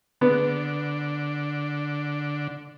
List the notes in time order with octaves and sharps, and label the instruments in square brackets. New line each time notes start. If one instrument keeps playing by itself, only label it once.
[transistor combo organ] D3 [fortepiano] B3